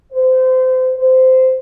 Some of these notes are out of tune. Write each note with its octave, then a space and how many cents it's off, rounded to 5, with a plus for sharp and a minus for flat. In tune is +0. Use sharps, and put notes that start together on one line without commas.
C5 -25
C5 -15